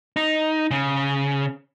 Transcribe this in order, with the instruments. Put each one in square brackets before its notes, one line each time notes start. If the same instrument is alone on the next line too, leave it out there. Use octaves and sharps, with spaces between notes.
[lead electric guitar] D#4
C#3